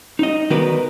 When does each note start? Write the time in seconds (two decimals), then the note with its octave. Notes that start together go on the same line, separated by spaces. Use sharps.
0.19 D#4 D#5
0.50 D#3 B3 F#4 A#4 B4 D5